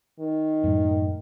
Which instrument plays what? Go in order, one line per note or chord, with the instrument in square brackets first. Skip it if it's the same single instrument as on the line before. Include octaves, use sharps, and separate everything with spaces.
[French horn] D#3
[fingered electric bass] F#2 A2